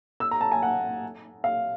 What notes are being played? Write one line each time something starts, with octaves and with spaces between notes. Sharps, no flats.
E6
A#5
A5
G#5
F#5
F5